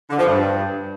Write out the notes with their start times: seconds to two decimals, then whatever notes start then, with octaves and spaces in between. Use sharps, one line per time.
0.10 D3
0.19 F3
0.27 G2